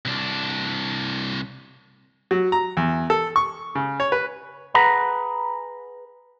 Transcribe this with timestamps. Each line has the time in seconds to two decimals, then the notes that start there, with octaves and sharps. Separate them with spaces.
0.05 C2 D4
2.31 F#3
2.52 A#5
2.77 E2
3.10 A4
3.36 C#6
3.75 C#3
4.00 C#5
4.12 B4
4.74 G#4 B4 F#5 A#5 B5